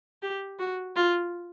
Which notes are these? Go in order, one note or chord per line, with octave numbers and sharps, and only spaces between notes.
G4
F#4
F4